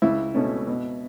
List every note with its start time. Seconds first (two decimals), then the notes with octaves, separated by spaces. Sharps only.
0.02 C#2 E4
0.34 B2 A3 C#4
0.67 B2